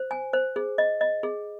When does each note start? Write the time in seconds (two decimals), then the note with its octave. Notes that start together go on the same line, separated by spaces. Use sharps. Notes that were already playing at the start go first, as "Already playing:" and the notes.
Already playing: C5
0.11 G#5
0.33 C5
0.56 G#4
0.78 D#5
1.01 D#5
1.23 G#4